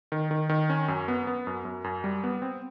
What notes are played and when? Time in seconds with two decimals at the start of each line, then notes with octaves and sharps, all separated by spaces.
0.12 D#3
0.31 D#3
0.49 D#3
0.70 C#4
0.88 F#2
1.08 B3
1.27 B3
1.47 F#2
1.65 F#2
1.84 F#2
2.04 G3
2.24 B3
2.42 C4